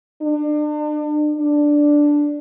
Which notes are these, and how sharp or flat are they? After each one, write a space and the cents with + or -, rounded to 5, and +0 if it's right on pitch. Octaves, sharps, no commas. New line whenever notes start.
D4 +35
D4 +0